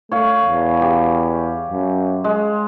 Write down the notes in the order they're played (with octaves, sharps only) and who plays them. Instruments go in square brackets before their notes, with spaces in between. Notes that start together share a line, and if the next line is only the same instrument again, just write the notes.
[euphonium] A3 [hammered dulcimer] C#5 F5
[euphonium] E2
[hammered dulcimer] G4
[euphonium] F#2
[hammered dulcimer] G#3